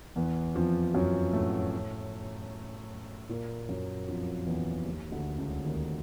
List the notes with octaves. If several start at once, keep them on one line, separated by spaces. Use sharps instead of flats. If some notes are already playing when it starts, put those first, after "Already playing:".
E2 E3
F2 F3
F#2 F#3
A2 A3
A#2 A#3
F#2 F#3
F2 F3
E2 E3
D#2 D#3
D2 D3
C#2 C#3
D#2 D#3